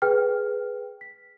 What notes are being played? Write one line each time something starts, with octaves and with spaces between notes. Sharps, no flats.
G#4 B4 G5 F6
B6